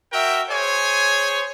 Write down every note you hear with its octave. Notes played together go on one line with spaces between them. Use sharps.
F#4 A#4 E5 G5
G#4 C5 C#5 G#5